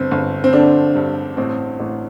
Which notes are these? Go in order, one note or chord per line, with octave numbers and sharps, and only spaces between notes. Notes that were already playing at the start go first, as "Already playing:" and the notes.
Already playing: G1 C4
G1
C4
D3 D4
G2
A1 C4
A1